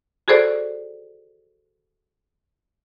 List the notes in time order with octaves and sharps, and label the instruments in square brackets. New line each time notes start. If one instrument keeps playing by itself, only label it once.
[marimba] F#4 G#4 A4 C5 D5